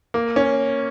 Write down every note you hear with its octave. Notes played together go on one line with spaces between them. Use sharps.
A#3
C#4